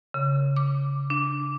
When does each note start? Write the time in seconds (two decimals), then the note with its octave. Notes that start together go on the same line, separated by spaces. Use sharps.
0.14 C#3
0.56 D6
1.10 D4